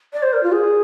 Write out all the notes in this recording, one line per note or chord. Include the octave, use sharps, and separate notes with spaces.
D5
C5
A#4
F4
G#4